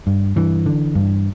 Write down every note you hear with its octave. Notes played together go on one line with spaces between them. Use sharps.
G2
G2 E3
D3
G2